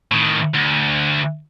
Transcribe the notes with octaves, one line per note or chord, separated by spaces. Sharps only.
A2 D#3
D2